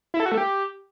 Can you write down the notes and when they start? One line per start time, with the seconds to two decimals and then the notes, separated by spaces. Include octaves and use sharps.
0.14 E4
0.20 A4
0.26 F#4
0.32 A3
0.38 G4